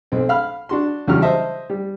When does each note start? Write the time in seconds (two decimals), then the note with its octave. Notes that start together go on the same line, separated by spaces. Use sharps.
0.12 B1 C4
0.29 F5 B5 F6
0.69 D4 F#4 C6
1.08 E2 C#3 E3 F#3 G3 F6
1.22 C5 D#5 E5 A5
1.70 G3